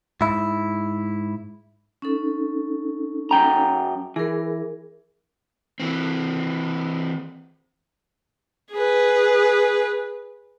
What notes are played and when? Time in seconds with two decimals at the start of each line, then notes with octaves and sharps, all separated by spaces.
0.21 G#2 E4
2.02 C#4 D#4 A4
3.31 F#2 G5 A#5
4.16 E3 G#4 A#4
5.80 E3 C4
8.72 G#4 B4